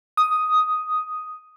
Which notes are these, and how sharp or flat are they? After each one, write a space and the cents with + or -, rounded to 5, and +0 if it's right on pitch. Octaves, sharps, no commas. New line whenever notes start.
D#6 +5